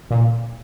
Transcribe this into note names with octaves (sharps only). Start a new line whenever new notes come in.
A#2